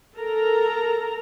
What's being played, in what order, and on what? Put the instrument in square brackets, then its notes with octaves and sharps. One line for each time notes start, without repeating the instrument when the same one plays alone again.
[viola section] A4 A#4 A#5